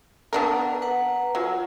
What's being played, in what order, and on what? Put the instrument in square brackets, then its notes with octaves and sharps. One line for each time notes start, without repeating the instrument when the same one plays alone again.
[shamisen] B3 D4 A#4
[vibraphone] B4 F#5 A#5
[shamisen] F#3 [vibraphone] F4